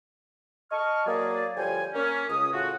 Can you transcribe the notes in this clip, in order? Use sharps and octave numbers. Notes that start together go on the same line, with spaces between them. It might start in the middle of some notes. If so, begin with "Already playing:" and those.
D#5 A5 C#6 F6
F#3 A#3 G#4 D5
D2 F3 G3 C#5 G5 G#5
A#3 C#4
C#2 D#6
A2 C#3 A3 F4 F#4